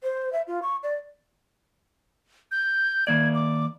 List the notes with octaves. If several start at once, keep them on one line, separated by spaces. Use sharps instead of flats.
C5
E5
F4
C#6
D5
G6
D#3 A#3 D5 G#6
D6